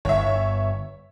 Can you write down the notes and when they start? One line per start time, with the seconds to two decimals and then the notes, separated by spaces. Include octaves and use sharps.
0.05 G1 C#5 E5